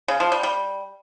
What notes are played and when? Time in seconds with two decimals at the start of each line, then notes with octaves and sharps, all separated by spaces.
0.08 C#3
0.20 F3
0.32 G3
0.43 G3